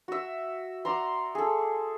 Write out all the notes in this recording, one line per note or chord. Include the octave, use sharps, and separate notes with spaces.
F#4 E5
D5 F#5 A#5 C6
G#4 A4